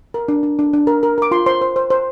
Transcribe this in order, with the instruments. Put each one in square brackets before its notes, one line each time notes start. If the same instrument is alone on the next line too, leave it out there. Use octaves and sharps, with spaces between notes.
[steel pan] A#4
D4
D4
D4
D4
A#4
A#4
A#4 D6
F4 C6
C5 C6
C5
C5
C5